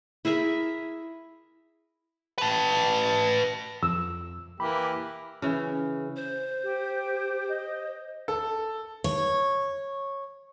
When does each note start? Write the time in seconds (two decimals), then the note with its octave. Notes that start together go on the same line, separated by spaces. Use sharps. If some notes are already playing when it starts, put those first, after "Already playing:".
0.25 E4 G#4 A#4 E5
2.38 B4 A5
3.83 F2 E6
4.60 E3 A#3 G4 B5
5.42 C#3 E3
6.16 C5
6.64 G4
7.49 D#5
8.28 A4
9.04 C#5